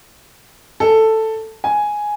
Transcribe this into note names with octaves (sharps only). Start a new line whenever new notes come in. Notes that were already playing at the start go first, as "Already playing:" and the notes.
A4
G#5